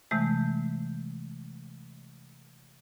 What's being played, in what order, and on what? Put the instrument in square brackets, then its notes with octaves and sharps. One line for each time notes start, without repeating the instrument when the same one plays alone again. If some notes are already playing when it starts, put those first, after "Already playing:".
[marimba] C3 E3 G#3 A3 G6